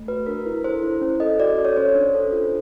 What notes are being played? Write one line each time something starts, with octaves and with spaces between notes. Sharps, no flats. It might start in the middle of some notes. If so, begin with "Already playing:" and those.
Already playing: A3
F#4 B4
D4 A#4
E4
A4 C5
E4
C#4
A4 D#5
F#4 D5
A4
C#5
C#4 C5
D4
A4
F4